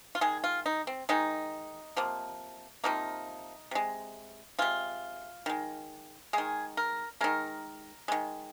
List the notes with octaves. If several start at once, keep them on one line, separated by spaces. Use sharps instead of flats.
F4
D#3 G#3 G#4
F4
D#4
C4
D#3 G#3 D#4
C3 F3 A#3
C3 F3 A#3 D#4
C3 G#3
C3 G#3 F4
D#3 G#3
D#3 G#3 G#4
A#4
D#3 G#3 A#4
D#3 G#3